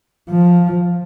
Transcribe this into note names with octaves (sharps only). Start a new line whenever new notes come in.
F3